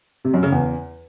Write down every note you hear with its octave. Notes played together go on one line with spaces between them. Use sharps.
C3
F#2
C#3
E2